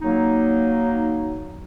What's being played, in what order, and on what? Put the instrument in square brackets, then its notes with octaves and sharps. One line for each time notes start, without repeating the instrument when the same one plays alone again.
[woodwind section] F#3 A#3 D#4